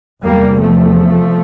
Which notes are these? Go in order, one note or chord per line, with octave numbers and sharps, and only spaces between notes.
E2 C3 G3 A#3
F3 A3